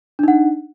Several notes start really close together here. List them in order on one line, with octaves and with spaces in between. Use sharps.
D4 D#4 F#5